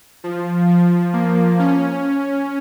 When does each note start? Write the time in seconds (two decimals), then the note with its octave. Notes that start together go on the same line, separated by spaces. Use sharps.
0.24 F3
0.68 F3
1.13 A#3
1.59 C#4